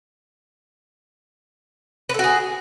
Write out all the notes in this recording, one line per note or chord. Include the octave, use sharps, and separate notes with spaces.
F#4 G#4 A4 B4